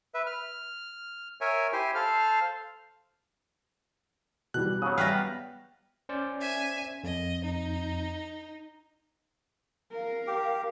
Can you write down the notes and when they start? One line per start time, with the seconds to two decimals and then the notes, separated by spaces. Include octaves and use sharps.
0.14 B4 E5
0.26 F6
1.41 A#4 C#5 E5 G#5
1.73 E4 G4 C5 G#5
1.95 A4 C5 F5 F6
4.54 B2 E3 G3 F#6
4.82 C#3 F#3 D#6
4.98 G3 B3 E5 G5 F6 F#6 A#6 C7
6.09 C#4 C5 D5
6.40 E5 G#5
7.04 F2 D#5
7.44 D#4
9.92 A#4 F5
10.27 G4